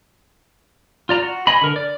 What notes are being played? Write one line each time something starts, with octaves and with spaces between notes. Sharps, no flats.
F4 D5 A#5
F#4
D#5 G#5 B5
D3 A#4
D5